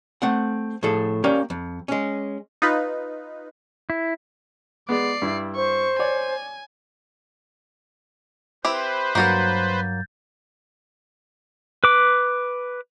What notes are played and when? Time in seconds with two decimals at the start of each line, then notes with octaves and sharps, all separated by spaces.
0.22 A3 C4 F#5
0.83 A2 F3 G#4 A4
1.24 A#3 C#4 G4 A#4 D5 F5
1.50 F2
1.88 G#3 C#4
2.62 D#4 F4 B4
3.90 E4
4.89 G#3 B3 D5 C7
5.22 G2 E4
5.56 C5 C#6
5.99 C#5 D5 G#5
8.65 C4 E4 G4 B4 C5
9.15 G2 F#3 A#3 F#4 A#4 G6 A6
11.84 B4 D6